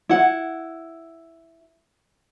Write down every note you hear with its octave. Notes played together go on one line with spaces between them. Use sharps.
E4 F#5